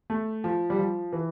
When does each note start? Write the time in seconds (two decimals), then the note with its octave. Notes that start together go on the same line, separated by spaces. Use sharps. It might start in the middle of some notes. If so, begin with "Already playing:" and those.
0.10 A3
0.44 F3
0.70 G3
0.79 F3
1.13 E3